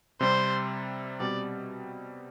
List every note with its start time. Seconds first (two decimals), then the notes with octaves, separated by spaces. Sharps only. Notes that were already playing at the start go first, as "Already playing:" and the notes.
0.20 C3 G3 C4 C5
1.20 B2 G3 C4 D5